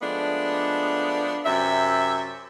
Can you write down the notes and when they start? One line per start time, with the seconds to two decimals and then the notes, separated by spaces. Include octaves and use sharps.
0.02 F3 G#3 A3 B3 D4
1.44 F#2 C3 E5